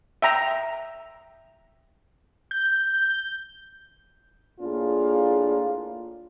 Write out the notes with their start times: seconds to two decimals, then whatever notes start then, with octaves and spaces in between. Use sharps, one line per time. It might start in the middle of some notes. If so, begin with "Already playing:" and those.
0.22 E5 G5 A#5
2.51 G6
4.60 A2 A#3 D4 F4 G#4